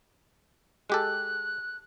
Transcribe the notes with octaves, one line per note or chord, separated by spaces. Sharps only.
G#3 G4 A4 F#6